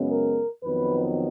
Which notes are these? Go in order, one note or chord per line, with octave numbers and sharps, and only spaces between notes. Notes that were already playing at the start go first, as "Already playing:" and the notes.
Already playing: F#2 C#3 G#3 B3
A#4
F2 D#3 F#3 B3 B4